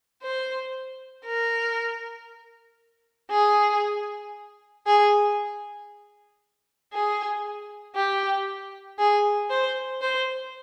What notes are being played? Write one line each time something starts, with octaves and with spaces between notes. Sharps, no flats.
C5
A#4
G#4
G#4
G#4
G4
G#4
C5
C5